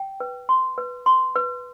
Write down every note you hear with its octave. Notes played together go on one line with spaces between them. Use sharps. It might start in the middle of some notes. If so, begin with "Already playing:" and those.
Already playing: G5
B4
C6
B4
C6
B4